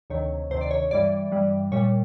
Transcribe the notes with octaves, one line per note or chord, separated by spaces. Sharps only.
D2 C3 D#3 C#5
D2 C3 D#3 C5
D5
C#5
G2 E3 G3 D5
G2 E3 G3
A#2 G3 C#5